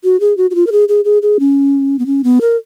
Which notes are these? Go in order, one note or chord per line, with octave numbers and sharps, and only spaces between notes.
F#4
G#4
F#4
F#4
F4
A#4
G#4
G#4
G#4
G#4
C#4
B3
C#4
B3
A#4